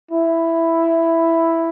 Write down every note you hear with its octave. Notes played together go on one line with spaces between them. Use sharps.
E4